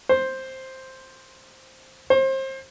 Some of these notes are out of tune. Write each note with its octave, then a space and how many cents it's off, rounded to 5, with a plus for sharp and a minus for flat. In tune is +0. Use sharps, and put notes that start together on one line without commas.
C5 +5
C5 +30